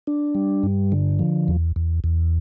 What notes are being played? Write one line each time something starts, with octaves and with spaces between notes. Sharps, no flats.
D4
G3
G2
D3
F3
E2
E2
E2